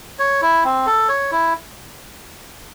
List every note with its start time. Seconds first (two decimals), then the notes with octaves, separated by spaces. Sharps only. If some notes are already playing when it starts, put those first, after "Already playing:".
0.19 C#5
0.42 E4
0.64 C4
0.86 A4
1.09 C#5
1.31 E4